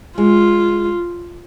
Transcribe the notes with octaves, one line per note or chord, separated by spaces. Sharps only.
G#3 F4